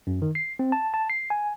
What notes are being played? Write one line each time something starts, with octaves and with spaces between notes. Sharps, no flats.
F#2
D#3
C7
C4
A5
A5
C7
G#5